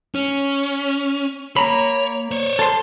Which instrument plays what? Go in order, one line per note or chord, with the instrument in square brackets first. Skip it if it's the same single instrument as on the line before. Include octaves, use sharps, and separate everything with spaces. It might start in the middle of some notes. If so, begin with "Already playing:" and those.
[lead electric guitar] C#4
[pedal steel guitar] A#3 A#5 B5 [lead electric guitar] C#5
[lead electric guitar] C5 C#5
[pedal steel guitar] A4 C6